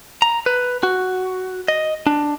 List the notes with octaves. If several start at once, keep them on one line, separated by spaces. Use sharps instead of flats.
A#5
B4
F#4
D#5
D4